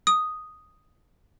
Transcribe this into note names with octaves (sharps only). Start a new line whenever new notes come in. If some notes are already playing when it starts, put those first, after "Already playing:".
D#6